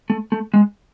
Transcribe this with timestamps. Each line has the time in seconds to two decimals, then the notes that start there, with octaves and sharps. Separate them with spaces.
0.10 A3
0.32 A3
0.54 G#3